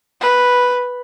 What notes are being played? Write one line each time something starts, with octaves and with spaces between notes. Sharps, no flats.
B4